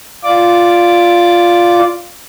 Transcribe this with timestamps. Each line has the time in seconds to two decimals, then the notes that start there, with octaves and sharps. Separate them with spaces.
0.24 F4 D5 D6